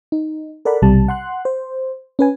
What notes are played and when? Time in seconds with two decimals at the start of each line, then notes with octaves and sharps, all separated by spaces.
0.12 D#4
0.65 A4 A#4 D5 F#5 B5
0.82 B1 C3 G3 A5
1.08 F#5 C6 F#6
1.45 C5
2.19 C#4 B4 G#5